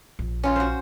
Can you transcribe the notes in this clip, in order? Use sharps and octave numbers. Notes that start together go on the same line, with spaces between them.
A#1
C#4 F4
F#4 C5